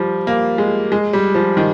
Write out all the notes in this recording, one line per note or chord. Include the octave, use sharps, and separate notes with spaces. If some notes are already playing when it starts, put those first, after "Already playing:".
Already playing: F3 G3
A#3
G#3
G#3
G3
F3
D#3